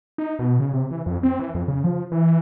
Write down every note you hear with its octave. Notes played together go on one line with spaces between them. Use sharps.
D#4
B2
C#3
C3
E3
F2
C4
E3
F2
C#3
F3
E3